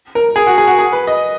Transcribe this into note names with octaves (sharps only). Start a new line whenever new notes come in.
A#4
G#4
F#4
G#4
F#4
G#4
B4
D#5